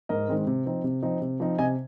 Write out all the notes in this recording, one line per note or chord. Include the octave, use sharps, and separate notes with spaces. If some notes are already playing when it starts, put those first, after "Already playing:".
G#2 A#4 D#5
D#3 G#3 C4
C3
F3 C4 D#4
C3
F3 C4 D#4
C3
F3 C4 D#4
C3 D#5 G#5